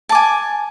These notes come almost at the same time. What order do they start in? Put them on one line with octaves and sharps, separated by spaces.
A5 D6 G#5